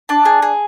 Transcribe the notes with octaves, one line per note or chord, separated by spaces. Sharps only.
D4 A5
G#4
G#4